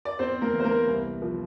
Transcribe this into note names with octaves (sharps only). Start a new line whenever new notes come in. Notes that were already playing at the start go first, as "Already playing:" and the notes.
D5
E2 C4 C5
A#3 A#4
E3
C5
A#3 A#4
C2
F3